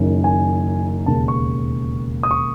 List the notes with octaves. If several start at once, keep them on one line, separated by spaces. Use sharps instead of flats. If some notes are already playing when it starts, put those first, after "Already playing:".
Already playing: F#1 F#2 D#3
G#5
E1 D#2 C#3 A5
C#6
D#6
C#6